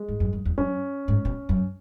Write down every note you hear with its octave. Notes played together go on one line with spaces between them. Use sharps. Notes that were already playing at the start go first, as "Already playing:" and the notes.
Already playing: G#3
G#2
F#2
F#2
E2
F#2 C#4
G#2
B2
F#2